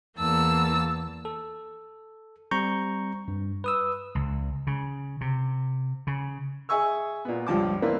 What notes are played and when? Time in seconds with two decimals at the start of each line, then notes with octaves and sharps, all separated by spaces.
0.18 E2 A#3 A5 E6
1.25 A4
2.51 G3 C4 A#5 C#6 G6
3.28 G2
3.64 B4 D#6 E6
4.15 C#2
4.67 C#3
5.21 C3
6.07 C#3
6.69 G#4 E5 G#5 C#6 E6
7.25 A#2 B3
7.47 C#2 G2 F3 A5 D6
7.82 E3 A#3 C4 E4 B4 D5